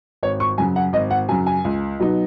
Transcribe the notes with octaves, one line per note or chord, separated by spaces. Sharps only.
G#1 C#5
C#6
F#2 C#3 F#3 G#5
F#5
G#1 D#5
F#5
F#2 C#3 F#3 G#5
G#5
C#2
B2 F#3 D#4